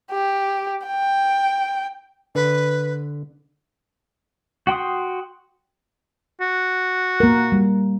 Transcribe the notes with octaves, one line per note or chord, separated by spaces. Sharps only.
G4
G5
D3 B4
F#4 G5 C6 D#6
F#4
A#3 A#4
G3